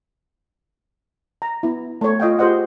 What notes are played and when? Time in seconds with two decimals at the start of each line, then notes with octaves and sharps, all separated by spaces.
1.42 A#5
1.63 B3 E4
2.01 A3 C#5
2.20 F4 D#5 F5 G5
2.39 F4 G4 G#4 C5 D#5 F#5